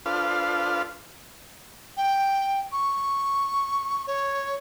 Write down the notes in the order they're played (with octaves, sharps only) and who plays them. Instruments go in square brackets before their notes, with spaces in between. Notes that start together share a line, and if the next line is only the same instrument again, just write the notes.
[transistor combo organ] D4 F4 A4 B4 C5 F5
[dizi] G5
C#6
C#5